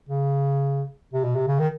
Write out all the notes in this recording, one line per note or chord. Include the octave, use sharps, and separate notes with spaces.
C#3
C3
B2
C3
C#3
D#3